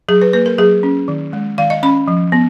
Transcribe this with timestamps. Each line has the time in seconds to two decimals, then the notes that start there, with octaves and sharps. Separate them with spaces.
0.08 F#3 G#4
0.21 B4
0.33 A#3 B4
0.46 A#4
0.58 F#3 G#4
0.83 C#4
1.08 D#3
1.33 G#3
1.58 D#3 F5
1.70 D#5
1.83 C#4 B5
2.08 F3
2.32 B3